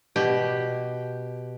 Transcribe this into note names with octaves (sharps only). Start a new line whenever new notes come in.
B2 G4